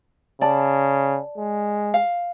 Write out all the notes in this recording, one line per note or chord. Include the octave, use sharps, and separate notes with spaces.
C#3 D5 A5
G#3
F5